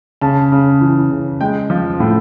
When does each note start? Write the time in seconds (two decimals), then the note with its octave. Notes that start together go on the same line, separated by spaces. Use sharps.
0.21 C#3 A5
0.52 C#3
0.81 E3
1.11 C#3
1.41 G#3 G5
1.70 F3
2.00 A2